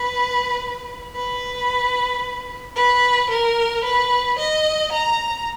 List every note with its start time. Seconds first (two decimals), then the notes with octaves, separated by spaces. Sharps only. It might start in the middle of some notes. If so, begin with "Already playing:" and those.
Already playing: B4
1.15 B4
2.76 B4
3.30 A#4
3.85 B4
4.39 D#5
4.92 A#5